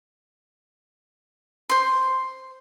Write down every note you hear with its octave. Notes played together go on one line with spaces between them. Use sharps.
C5 C6